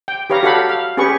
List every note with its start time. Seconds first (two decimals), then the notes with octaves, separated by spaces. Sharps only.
0.08 G5
0.30 G4 B4 C#5 F5 A#5
0.43 F#4 G4 A4 F5 F#5 B5
0.69 F5
0.97 C#4 G4 G#4 B4 C#6